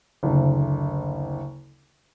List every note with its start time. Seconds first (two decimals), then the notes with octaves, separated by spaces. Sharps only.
0.23 F#1 D2